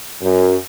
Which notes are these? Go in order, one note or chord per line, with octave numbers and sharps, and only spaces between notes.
F#2